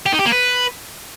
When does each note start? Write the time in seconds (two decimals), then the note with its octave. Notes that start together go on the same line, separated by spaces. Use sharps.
0.06 G4
0.13 D#4
0.19 G4
0.26 A#3
0.32 B4